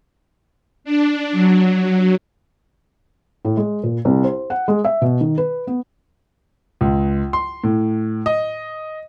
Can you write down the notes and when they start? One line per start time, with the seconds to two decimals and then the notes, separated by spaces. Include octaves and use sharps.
0.84 D4
1.32 F#3
3.45 A2
3.57 G#3
3.83 A#2
4.05 C2
4.24 C5
4.50 F#5
4.68 G#3
4.85 E5
5.01 B2
5.21 D#3
5.38 B4
5.67 B3
6.81 C#2
7.33 C6
7.64 A2
8.26 D#5